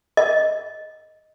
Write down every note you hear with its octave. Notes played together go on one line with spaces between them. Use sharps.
D#5